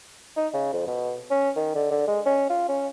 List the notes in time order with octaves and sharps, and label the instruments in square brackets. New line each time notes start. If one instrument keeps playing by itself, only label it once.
[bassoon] D#4
C#3
F2
B2
C#4
D#3
D3
D3
G#3
C#4
F4
C#4